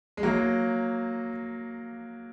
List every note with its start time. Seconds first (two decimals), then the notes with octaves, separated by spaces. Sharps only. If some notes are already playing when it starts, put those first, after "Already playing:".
0.17 G#3
0.23 F#3 A#3